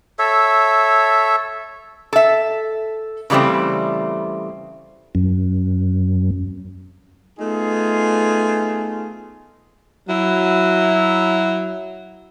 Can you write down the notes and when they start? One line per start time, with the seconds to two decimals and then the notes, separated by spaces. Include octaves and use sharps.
0.19 A4 C#5 E5
2.13 A4 E5
3.30 C#3 E3 G3 A3 C4
5.15 F#2
7.39 A3 B3 D#4 F4 G#4
10.08 F#3 E4